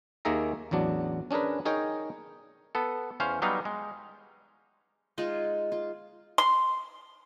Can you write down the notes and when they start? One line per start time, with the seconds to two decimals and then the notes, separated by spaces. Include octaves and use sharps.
0.25 D#2 D#3 A#3 G#4 E5 A#5
0.71 A1 E2 F#3 D4
1.31 C#4 D4 G#4 A#4 B4
1.65 D#4 G#4 A#4 C#5 D#5 G5
2.75 B3 A4
3.20 E2 C#4 C5 F5
3.42 F#3 G3 B3 D#4 F5
3.65 G#3
5.18 G#3 D#4 F4 G#4
5.72 F4
6.38 C6